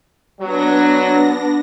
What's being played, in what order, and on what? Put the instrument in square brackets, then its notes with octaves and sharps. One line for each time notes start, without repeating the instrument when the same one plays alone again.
[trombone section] F#3 [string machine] B3 D4 A#6